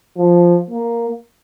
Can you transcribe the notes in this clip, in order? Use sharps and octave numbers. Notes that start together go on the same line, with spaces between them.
F3
A#3